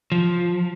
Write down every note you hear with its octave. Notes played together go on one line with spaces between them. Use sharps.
F3